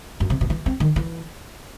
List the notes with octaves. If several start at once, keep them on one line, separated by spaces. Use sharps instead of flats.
F#2
C3
B2
E3
C4
D#3
E3